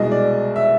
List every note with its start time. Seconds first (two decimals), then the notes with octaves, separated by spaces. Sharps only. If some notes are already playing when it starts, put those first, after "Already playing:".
Already playing: C2 B2 G#3 D#5
0.12 D5
0.56 E5